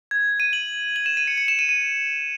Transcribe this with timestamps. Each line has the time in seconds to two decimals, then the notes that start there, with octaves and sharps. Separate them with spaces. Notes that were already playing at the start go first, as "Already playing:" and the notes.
0.11 G#6
0.40 D#7
0.53 F#7
0.96 F#7
1.06 E7
1.17 D#7
1.28 C#7
1.38 C#7
1.48 E7
1.59 D#7
1.69 D#7